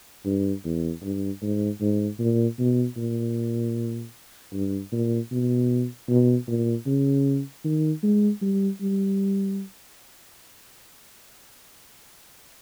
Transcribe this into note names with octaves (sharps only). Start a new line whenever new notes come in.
G2
E2
G2
G#2
G#2
A#2
B2
A#2
G2
A#2
B2
B2
A#2
C#3
D#3
G#3
G3
G3